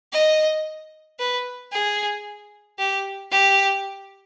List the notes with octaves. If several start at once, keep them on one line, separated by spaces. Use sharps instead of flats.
D#5
B4
G#4
G4
G4